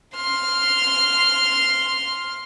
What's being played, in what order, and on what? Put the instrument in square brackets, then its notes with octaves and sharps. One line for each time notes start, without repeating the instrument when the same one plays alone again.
[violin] C6 F6